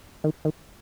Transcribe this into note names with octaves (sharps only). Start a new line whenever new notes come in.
D#3
D#3